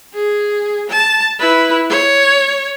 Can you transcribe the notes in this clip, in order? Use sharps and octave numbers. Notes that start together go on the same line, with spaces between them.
G#4
A5
E4 B4
C#5